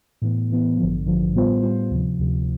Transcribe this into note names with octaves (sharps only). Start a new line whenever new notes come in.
A2 E3 B3
A2 E3 B3
A1 G2 D3 F3
A1 G2 D3 F3
A2 G3 B3 F4 C5
A2 G3 B3 F4 C5
D2 C3 F3
D2 C3 F3